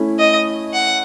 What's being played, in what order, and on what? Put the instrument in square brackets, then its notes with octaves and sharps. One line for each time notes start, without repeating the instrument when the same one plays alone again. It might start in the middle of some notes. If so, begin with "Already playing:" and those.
Already playing: [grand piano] A3 C#4 E4
[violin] D#5
F#5